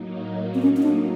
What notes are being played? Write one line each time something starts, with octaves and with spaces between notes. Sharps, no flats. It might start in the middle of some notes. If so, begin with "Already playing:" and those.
Already playing: A2 F#3 A#3 D#4
C4
C#4
C#4
D4